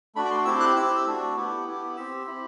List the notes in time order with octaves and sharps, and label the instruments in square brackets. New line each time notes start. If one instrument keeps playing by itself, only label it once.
[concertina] A3 D4 F#4 B5
D6
C6
C4 E4 G4 E6
F#6
C4 E4 G4 E6
A3 D4 F#4
B3 E4 G4
B3 E4 G4
C4 G4 E6
C4 E4 G4